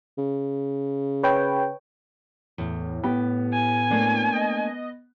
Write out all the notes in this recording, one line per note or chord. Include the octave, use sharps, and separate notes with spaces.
C#3
B4 C#5 G5
E2 A2
B3 G4
G#5
A3 A#3 D4
D#5